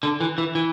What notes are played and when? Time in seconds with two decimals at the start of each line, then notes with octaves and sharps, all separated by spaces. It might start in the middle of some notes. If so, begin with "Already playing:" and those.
0.03 D3
0.20 E3
0.38 E3
0.55 E3